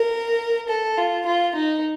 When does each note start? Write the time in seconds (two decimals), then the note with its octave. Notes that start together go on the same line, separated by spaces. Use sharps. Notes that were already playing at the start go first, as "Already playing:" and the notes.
Already playing: A#4
0.69 A4
0.98 F4
1.26 F4
1.56 D#4